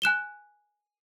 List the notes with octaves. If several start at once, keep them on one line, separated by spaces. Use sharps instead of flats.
G#5 F#6 E7 G7